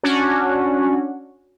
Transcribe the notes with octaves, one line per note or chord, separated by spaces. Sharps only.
C#4 D4 F#4